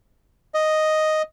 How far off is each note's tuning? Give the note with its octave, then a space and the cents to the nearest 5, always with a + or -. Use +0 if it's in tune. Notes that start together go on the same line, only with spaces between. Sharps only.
D#5 +0